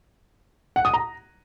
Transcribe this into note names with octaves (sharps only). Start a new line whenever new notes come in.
F#5
D#6
A#5